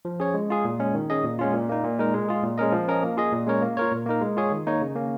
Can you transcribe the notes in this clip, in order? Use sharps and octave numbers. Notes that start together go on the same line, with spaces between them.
F3
C#4 G#4 C#5
G#3
F4 G#4
A#2
G#3 C#4
D#3
C#4 G#4 D#5
A#2
G#3 C#4 F4
A#2
A#3 D#4
A#2
G#3 D#4 A#4
G#3
F4 G#4
A#2
G#3 C#4 A#4 D#5
F3
C#4 A#4 D#5
A#3
F4 G#4 D#5
A#2
G#3 C#4 A#4 C#5
A#3
F4 A#4 C#5
A#2
A#3 D#4 A#4
G#3
F4 G#4 C#5
D#3
A#3 D#4 C#5
C#3
A#3 C#4